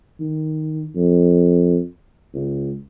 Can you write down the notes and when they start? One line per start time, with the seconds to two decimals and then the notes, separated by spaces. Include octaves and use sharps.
0.20 D#3
0.96 F2
2.34 C#2